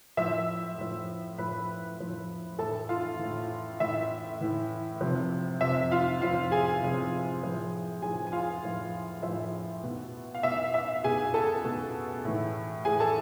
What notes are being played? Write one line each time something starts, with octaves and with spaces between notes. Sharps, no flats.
A2 F3 E5 E6
A2 F3
A2 F3 B4 B5
A2 F3
A2 E3 A4 A5
F4 F5
A2 E3
A2 E3 E5
A2 E3
C3 F3
C3 F3 E5
F4 F5
C3 F3 F4 F5
G#4 G#5
C3 F3
A2 F3
A2 F3 G#4 G#5
G#5
F4 F5
A2 F3
A2 F3 E5
B2
F5
B2 E5
E5
B2 G#4 G#5
A4 A5
B2
A2 E3
A2 E3 G#4 G#5
A4 A5